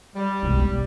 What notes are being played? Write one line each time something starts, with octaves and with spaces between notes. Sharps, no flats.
G3
B1 G#3
B3